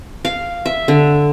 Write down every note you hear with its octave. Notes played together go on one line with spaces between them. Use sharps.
F5
E5
D3